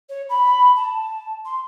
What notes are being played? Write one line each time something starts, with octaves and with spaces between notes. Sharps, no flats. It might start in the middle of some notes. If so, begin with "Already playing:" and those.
C#5
B5
A5
C6